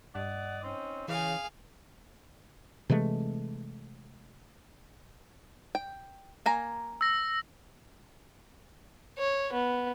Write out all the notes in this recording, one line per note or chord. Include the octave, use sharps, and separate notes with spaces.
G2 D5 D#5 F#5
C4 C#4 D#4
C#3 E3 G#4 F5
C3 E3 G#3 A3
G5
A#3 G#5 A#5
E6 A#6
C#5
B3